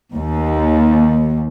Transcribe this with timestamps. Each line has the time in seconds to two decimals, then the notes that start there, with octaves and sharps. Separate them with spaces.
0.13 D#2